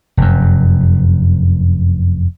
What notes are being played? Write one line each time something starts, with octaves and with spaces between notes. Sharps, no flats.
F1 F#2